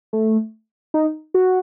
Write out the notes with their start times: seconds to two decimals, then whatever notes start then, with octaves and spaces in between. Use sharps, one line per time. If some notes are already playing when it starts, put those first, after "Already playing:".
0.13 A3
0.94 D#4
1.34 F#4